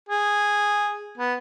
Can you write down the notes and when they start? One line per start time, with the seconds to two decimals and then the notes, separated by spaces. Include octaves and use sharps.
0.09 G#4
1.18 B3